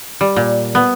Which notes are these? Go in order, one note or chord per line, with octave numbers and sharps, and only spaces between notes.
G3
A#2
B3